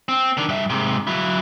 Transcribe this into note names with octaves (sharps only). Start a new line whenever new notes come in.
C4
D#3 D4
G2 E5
G#2 C3
F#3 E4